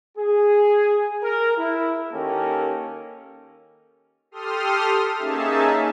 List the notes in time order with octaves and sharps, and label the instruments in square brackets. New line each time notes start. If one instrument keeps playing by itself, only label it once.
[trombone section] G#4
A#4
E4
D#3 A#3 C#4 G4 A4 A#4
[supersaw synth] G4 A4 C6 D#6 F6
A#3 C#4 D#4 G#4 E5 A5